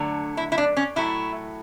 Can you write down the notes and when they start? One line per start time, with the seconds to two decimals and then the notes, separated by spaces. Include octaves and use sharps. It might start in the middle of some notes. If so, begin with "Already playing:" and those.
Already playing: D3 F#3 A3
0.37 E4
0.52 E4
0.58 D4
0.77 C#4
0.96 A2 F#3 A3 E4